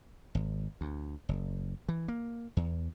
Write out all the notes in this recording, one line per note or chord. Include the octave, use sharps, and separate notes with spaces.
G#1
D2
F#1
E3
A#3
E2